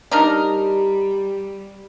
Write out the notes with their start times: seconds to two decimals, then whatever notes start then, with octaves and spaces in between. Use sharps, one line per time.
0.11 G3 D4 D#4 G4 A#4